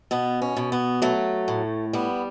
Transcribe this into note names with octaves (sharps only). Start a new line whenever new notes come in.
B2 B3
C#4
B2
B3
F#3 A3
A2
G3 B3